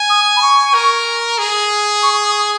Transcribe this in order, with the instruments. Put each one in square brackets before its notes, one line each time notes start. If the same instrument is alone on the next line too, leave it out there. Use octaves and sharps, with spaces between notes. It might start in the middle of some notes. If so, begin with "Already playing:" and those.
Already playing: [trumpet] G#5
[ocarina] D#6
B5
C#6
[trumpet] A#4
G#4
[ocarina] C#6
D#6